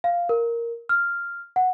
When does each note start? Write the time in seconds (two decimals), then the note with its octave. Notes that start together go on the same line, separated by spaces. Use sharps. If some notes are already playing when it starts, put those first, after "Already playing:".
0.04 F5
0.29 A#4
0.89 F6
1.56 F#5